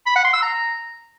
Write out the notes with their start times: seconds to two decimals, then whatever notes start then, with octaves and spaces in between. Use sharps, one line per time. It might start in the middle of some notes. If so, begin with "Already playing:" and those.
0.06 B5
0.15 F#5
0.24 C6
0.33 E6
0.42 A#5